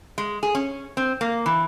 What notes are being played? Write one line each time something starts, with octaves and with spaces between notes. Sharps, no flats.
G#3
G#4
C#4
C4
A#3
E3